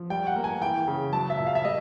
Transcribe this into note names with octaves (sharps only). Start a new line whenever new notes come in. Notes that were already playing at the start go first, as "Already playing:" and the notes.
Already playing: F3
G3 G5
F#5
A#3
G#5
E3 G5
C#3
F#3 A5
E5
A#2
F5
E5
G3 D#5